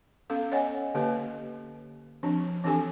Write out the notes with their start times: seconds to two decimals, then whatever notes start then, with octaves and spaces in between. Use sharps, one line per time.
0.30 B3 C#4 A4 F5
0.52 C#5 D#5 F#5 G#5
0.95 D3 A#3 G4 B4
2.23 F3 C4 D4
2.64 E3 C4 D4 G4 A4 G#5